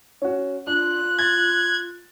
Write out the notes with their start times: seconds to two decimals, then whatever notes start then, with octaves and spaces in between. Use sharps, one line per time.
0.22 C#4 F#4
0.67 D4 F4 F#6
1.19 G#6 A6